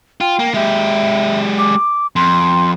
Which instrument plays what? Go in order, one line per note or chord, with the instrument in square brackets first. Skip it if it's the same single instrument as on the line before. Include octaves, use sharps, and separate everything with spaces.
[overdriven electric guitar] F4 [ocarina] G5
[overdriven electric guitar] A#3
[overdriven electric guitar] G#3 G4 [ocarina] E5
[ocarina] D6
[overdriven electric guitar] F2 [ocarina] C6